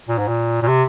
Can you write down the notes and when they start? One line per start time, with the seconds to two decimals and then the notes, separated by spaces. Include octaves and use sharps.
0.09 A#2
0.18 G#2
0.28 A#2
0.62 A#2
0.68 C3